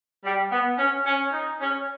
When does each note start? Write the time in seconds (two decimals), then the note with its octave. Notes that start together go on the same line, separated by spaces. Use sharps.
0.24 G3
0.50 B3
0.78 C#4
1.05 C#4
1.32 D#4
1.60 C#4